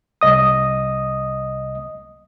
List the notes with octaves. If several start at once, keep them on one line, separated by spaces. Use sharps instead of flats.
C2 D#5 D#6